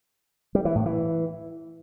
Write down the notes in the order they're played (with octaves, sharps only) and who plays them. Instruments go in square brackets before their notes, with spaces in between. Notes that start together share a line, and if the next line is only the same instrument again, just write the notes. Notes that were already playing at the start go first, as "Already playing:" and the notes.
[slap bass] G3
E3
A2
E3